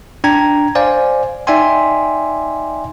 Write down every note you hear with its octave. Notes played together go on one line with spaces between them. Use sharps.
D4 G5 A#5 G#6
C5 D5 F5 G#5
D#4 D5 E5 G5 G#5 C6